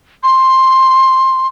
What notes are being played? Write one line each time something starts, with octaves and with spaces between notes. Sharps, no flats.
C6